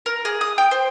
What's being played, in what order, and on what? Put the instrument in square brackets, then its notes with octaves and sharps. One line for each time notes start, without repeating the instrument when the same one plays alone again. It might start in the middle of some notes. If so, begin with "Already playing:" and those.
[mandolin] A#4
G#4
D#6
G5
C5